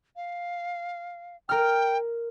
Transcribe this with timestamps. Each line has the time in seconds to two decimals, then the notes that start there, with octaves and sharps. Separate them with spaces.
0.16 F5
1.49 A#4 G5 F6